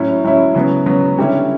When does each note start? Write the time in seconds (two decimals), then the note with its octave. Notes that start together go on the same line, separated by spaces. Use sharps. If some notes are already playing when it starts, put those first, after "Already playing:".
Already playing: A2 F#3 C#4 E4
0.24 A2 F#3 C#4 E4
0.54 C#3 F#3 B3
0.86 C#3 F#3 B3
1.18 D3 G3 C#4 E4